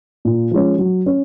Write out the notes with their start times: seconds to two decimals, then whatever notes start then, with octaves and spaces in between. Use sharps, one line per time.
0.25 A#2
0.51 F3 G#3 C#4
0.78 F#3
1.06 C#4